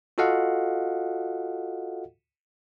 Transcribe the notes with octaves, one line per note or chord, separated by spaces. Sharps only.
F4 F#4 A4 D#5 F5 F#5